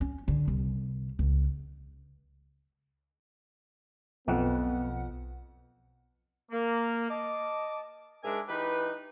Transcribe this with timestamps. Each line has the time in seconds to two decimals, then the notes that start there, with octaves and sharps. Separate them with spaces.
0.01 C#4
0.28 D3
0.48 C2
1.19 C#2
4.28 B1 F2 F3 B3 F#5
6.51 A#3
7.10 D#5 A5 D6
8.24 G#2 G#3 D4 A#4 E5 G#5
8.48 E3 D#4 G4 B4